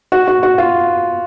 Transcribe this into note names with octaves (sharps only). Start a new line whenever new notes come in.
F#4
F#4
F#4
F4